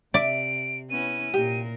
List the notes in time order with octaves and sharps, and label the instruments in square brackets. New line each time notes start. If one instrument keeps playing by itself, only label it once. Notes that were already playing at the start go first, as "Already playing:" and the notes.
[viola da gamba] C3 [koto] D5 [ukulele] E5 [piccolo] D7
[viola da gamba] B3 C#4 E4 [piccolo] D#7
[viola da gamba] A#2 A#4 [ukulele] G4